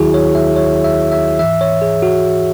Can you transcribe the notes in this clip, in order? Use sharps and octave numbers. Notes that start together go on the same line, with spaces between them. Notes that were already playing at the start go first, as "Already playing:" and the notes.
Already playing: D#2 D#3 F#3 E4 F#4 G#4
C#5
E5
C#5
E5
E5
G#2 E3 E5
C#5
G#4
F#4